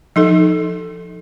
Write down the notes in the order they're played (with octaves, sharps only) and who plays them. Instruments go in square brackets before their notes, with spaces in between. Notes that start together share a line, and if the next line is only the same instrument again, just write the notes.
[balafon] F3 D#4 A4